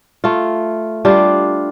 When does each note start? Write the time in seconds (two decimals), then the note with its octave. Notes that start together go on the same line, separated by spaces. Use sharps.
0.24 A3 F4
1.05 G3 D4 F4